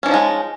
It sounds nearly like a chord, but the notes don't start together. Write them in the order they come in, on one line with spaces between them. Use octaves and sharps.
C#4 E3 F3 D#4 G#3